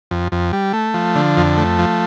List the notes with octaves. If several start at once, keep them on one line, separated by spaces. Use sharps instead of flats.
F2
F2
G3
A3
F3
D3
F2
A3
F3